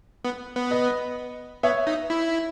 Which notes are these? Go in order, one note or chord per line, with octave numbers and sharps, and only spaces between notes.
B3
B3
B4 D#5
B3 C#5 E5
D#4
E4